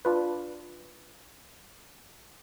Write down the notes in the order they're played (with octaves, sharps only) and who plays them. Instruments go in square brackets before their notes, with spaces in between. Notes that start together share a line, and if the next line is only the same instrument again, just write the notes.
[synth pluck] D4 F4 B4